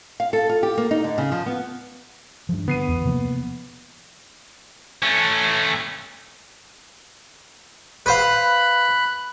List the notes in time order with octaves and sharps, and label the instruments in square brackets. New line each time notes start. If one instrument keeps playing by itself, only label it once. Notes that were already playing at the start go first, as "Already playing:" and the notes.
[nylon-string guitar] F5
A4
F4
G4
A#3
D#4
D3
C#3
F3
B3
[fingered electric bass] G2 F3
[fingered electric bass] D3 [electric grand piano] B3 C7 D#7
[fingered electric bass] E2
C3 F3 A#3
[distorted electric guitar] A3 C#4
[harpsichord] B4 C5 F5 [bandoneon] B5 F#6